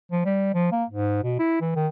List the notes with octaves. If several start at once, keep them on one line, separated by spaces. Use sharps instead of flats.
F3
G3
F3
A#3
G#2
B2
E4
E3
D#3